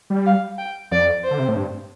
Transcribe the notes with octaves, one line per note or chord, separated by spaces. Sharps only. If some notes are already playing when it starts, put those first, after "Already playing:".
G3
F5
G5
F2 D5
C5
D3
C3
A2
G2